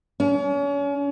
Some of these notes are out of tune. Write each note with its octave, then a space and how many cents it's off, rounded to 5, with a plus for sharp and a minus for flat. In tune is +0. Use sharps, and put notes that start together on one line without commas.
C#4 +35